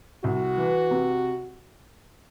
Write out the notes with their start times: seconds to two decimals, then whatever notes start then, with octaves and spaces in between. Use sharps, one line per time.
0.24 C2 F#4
0.57 E3
0.91 C3